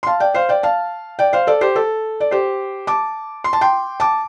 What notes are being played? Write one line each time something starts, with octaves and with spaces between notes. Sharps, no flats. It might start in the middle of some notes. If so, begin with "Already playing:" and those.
C6
F5 A5
D5 G5
C5 F5
D5 G5
F5 A5
D5 G5
C5 F5
A4 D5
G4 C5
A4
D5
G4 C5
A5 D6
C6
A5
G5 C6
A5 D6